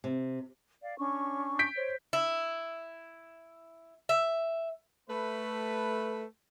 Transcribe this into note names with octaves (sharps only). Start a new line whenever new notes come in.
C3
D5 F5
C#4 D4 C#6
G6 B6 D7
C5 C#5
E4
E5
A3 B4